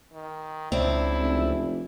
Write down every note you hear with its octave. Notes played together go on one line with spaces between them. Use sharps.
D#3
C#2 C4 D4 E4
F1